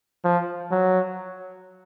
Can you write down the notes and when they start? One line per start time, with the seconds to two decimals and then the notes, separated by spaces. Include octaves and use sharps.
0.25 F3
0.71 F#3